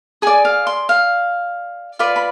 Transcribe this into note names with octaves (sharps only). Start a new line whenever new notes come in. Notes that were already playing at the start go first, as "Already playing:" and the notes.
G#4 D5 G#5
F5
C6
F5
F4 B4 D5
B5